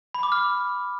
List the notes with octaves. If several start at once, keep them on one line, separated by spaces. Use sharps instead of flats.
B5
D6
F6